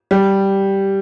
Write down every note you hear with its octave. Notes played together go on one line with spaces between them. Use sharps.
G3